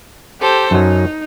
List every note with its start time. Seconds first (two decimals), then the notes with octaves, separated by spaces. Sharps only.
0.40 G4 A4 C5
0.71 F#2 F#3 D#4